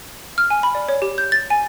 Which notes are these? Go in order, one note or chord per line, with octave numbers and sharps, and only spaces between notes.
F6
G#5
B5
D5
C#5
G4
G6
A6
G#5